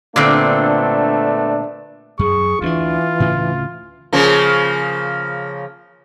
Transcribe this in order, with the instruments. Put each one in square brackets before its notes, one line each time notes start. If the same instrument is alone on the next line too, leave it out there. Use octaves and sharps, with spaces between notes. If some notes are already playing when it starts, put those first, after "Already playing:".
[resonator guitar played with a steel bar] A#2 D3 C4 [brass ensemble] A3 B3 D4
[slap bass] F#2 [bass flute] G#4 [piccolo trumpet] C#6
[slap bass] D2 C#4 D4 [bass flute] E3 [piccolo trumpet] F4
[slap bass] D2 A2 C#3
[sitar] C#3 F3 A#3